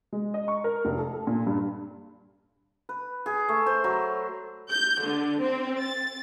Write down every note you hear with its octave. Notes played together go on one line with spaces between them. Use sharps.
G#3
D#5
C#6
A#4
F1
A4
A4
A#2
G2
B4
G#4
A3
C5
F#3
G6
D3
C4
A6